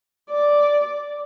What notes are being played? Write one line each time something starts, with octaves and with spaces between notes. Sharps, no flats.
D5